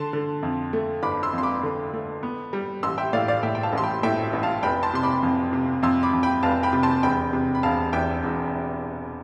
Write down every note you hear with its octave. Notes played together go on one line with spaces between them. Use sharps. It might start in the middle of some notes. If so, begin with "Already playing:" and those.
Already playing: D3 A5 C6
D3
F2
A3
G1 B5 D6
C6 E6
F2 C6
B5 D6
D3
A3
B3
G3
A1 C6 E6
E5 G5
A2 D5 F5
D5 F5
A2 E5 G5
G5
F5 A5
A1 C6
G5 B5
A2 E5 G5
E5
A1
F5 A5
F1 G5 B5
A5 C6
C3 C6
B5 D6
F2
C3
F2 C6 E6
B5 D6
F2
G5 B5
F1 F5 A5
G5 B5
C3
A5 C6
E1 G5 B5
C3
B5
E1 F5 A5
E2 E5 G5
E1